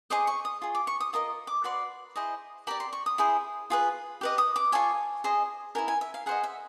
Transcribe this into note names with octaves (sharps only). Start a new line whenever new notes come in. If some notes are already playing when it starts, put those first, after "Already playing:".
G#4 C5 D#5 D6
C#6
D#6
F4 G#4
D6
C#6
D#6
F4 A#4 D#5 D#6
D6
F#4 B4 D5 C6
E4 G#4 C5 D#5
G4 A#4 D5 B5
C6
C#6
D#6
E4 G#4 C5
F4 G#4 B4
G4 B4 D#5
D#6
D6
F4 A4 C#5 G#5
G#4 C5 D#5
E4 G4 A#4 G#5
G#5
E5
F5
G#4 C5 D#5 F#5
E5